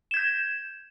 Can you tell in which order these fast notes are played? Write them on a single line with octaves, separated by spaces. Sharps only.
E7 G#6 G6